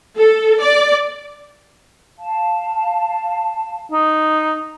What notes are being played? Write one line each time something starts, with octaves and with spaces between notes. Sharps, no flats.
A4
D5
F5 A5
D#4